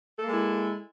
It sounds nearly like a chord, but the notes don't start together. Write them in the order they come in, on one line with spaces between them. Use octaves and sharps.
A4 A#3 G#3 E4